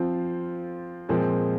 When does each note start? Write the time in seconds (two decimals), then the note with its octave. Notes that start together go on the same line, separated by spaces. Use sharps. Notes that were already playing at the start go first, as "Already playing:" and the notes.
Already playing: F3 C4 F4
1.09 A#2 F3 G#3 C4